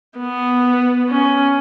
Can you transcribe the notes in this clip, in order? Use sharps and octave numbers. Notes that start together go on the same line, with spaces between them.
B3
C#4